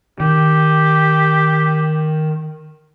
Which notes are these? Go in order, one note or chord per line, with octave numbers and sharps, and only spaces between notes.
D#3 G4